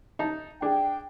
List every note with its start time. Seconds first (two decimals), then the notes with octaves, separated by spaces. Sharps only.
0.19 D#4 A5
0.62 D4 G#4 G5